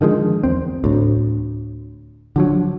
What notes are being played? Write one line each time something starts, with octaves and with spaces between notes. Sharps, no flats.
D3 D#3 F3 G#3
E2 C4
D2 A2
D3 F3 F#3